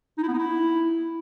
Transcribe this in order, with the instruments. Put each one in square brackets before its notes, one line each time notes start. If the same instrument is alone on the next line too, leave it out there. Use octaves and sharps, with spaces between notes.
[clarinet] D#4
E4
B3
D#4
E4